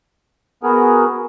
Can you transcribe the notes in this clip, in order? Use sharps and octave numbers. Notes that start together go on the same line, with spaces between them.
B3 F#4 G#4 A#4